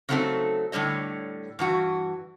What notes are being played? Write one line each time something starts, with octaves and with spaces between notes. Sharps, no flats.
C#3 F#3 A3 C4 D#4 A4
A2 D3 G3 C#5 D#5
G2 E3 F#4